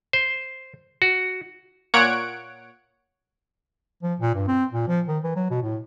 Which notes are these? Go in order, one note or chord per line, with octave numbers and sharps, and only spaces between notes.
C5
F#4
A#2 C#5 F#5 D7
F3
A#2
G2
C4
A#2
F3
D#3
E3
F#3
B2
A2